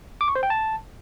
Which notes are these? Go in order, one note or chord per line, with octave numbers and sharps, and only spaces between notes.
D6
C#6
C5
G5
A5